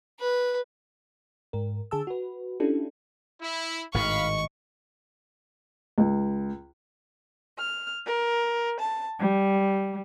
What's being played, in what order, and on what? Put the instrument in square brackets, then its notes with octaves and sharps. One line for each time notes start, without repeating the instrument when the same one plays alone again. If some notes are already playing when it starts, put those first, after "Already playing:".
[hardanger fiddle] B4
[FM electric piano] G#2 A#4
D3 G#4 A5 E6
F#4 B4
C#4 D4 E4 F4 G4 A4
[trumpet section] E4
[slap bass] G#1 A2 D#3 [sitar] D#4 [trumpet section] F5 B5 [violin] C#6
[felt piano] C#2
[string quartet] F6
A#4
A5
G3